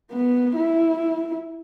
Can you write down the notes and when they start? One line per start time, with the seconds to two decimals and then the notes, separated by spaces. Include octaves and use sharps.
0.12 B3
0.55 E4